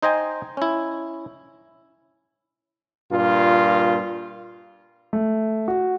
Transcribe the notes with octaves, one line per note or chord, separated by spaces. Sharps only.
D#4 C5 D#5 G5 G#5
C#4 E4
G2 A#2 F4
A3
F#4